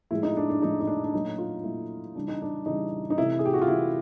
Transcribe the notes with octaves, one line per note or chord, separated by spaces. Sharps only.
A2 F3 G#3 E4
D#4
D4
D4
A2 F3 G#3 D#4
D#4
D4
D4
A#2 F#3 A3 D#4
F4
A#2 F#3 A3 E4
C#3 E3 G3 D4
D#4
D4
C#3 E3 G3 D#4
D#4
C3 E3 A3 E4
G#4
G4
F#4
F4
C3 E3 A3 E4